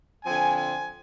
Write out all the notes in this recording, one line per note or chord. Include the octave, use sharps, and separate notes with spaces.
D3 F3 C4 G#5
G#5